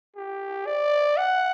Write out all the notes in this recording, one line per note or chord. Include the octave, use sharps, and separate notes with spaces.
G4
D5
F#5